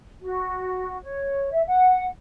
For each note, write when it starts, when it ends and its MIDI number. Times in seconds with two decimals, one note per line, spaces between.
0.21 0.96 66
1.03 1.51 73
1.51 1.60 76
1.65 2.05 78